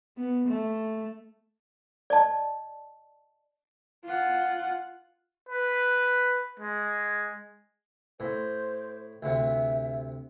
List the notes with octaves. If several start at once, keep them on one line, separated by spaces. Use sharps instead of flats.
B3
A3
D5 D#5 A5
F4 F#5
B4
G#3
A2 C5
D2 C3 E5